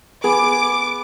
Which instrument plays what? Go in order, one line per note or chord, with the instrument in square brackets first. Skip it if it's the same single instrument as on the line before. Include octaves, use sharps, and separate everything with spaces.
[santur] B3 [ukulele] G#4 [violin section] D6